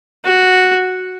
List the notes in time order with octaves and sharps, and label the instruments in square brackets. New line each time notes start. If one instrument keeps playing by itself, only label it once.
[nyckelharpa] F#4